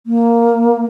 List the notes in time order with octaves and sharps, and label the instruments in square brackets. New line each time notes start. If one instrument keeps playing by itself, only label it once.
[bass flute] A#3